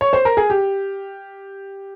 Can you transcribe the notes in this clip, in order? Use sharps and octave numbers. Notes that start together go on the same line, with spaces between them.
C#5
C5
A#4
G#4
G4